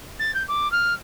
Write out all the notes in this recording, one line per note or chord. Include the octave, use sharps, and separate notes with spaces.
A6
G6
D6
F6